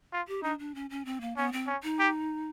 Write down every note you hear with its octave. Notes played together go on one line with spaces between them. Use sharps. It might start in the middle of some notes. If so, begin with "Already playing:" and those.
F4
G4
D4 D#4
D4
C#4
C#4
C4
A#3
B3 C#4
C4
C#4
D#4
G4